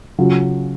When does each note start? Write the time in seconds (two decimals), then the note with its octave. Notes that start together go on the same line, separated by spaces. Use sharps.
0.18 C#3 F#3 C#4 F4